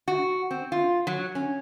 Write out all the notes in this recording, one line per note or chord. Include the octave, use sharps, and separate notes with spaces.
F#4
C4
F4
F#3
C#4